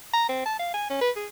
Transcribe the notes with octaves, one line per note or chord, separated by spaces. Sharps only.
A#5
C4
A5
F5
G#5
C#4
B4
G#4